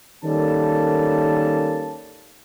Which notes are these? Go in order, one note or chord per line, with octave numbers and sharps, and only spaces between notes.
D#3 G3 A#3 C#4 A4 A5